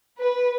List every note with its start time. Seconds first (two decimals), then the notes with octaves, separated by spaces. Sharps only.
0.19 B4